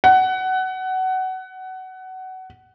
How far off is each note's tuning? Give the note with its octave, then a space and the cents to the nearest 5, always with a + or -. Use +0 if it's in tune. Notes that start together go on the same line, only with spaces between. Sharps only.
F#5 +20